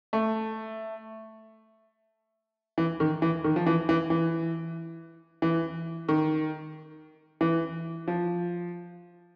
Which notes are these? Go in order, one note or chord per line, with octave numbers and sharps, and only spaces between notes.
A3
E3
D#3
E3
D#3
F3
E3
E3
E3
E3
D#3
E3
F3